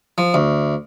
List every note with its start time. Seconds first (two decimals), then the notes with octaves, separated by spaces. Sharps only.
0.18 F3
0.34 D2